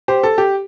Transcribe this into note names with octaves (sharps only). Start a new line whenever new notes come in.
G4 C5
A4
G4